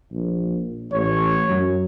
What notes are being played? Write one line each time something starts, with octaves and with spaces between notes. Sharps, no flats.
A#1
A1 C#5
F#2